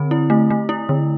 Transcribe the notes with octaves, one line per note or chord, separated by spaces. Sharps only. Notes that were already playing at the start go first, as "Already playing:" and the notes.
Already playing: D3 C4
E4
A3
A3
E4
D3